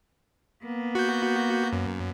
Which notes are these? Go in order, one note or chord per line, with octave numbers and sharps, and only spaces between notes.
A#3 B3
F#4 G6
F#2